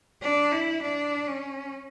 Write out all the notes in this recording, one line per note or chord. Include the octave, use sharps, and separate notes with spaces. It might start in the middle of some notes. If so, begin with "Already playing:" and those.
D4
E4
D4
C#4